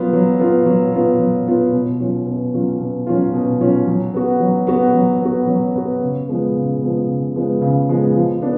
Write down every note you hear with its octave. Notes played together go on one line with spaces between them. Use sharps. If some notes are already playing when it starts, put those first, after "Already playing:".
Already playing: F#3 B3 F4
F#3
B3 F4
F#3
B3 F4
F#3
B3 F4
B2
F#3 C#4 F4
B2
F#3 C#4 F4
B2
F#3 C#4 F4
B2
F#3 C#4 F4
F#3
B3 F#4
F#3
B3 F#4
F#3
B3 F#4
F#3
B3 F#4
C#3
F3 G#3 B3
C#3
F3 G#3 B3
C#3
F3 G#3 B3
C#3
F3 G#3 B3
F3
B3 D4